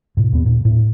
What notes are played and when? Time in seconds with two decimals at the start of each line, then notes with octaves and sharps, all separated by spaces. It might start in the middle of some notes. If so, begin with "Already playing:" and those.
0.17 G#2 B2
0.33 D#2 B3
0.46 A#2
0.65 A2